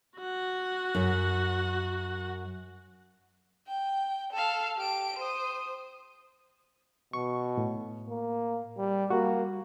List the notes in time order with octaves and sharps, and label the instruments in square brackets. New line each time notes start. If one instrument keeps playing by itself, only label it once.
[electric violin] F#4 F#5
[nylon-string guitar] F#2
[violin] G5
A4 F5
G4 D7
C5 D#6
[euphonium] B2 [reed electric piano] C#6
[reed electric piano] A2
[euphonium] A#3
G3
[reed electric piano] G3 F#4 [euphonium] A#3